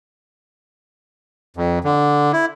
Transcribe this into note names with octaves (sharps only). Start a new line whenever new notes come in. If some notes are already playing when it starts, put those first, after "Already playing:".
F2
D3
E4